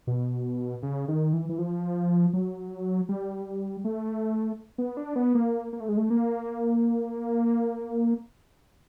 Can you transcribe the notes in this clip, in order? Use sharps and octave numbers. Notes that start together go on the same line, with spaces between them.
B2
C#3
D#3
E3
E3
F3
F#3
G3
A3
B3
D4
B3
A#3
A#3
A3
G#3
A3
A#3